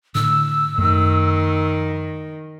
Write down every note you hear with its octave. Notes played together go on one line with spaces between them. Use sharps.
A2 D3 E6
F#2 D#3 A3